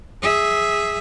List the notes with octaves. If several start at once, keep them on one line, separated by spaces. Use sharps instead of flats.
G#4 E5